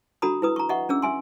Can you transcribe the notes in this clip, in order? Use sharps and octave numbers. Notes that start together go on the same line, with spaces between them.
D4 F#4 A4 A#5 B5 D#6
E4 B4 D#6
A#5 C#6
D#5 E5 F#5 C#6
C#4 D4 G#4 E6
E5 G#5 C6